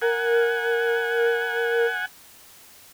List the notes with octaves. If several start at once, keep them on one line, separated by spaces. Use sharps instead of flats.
A#4 F#5 G#5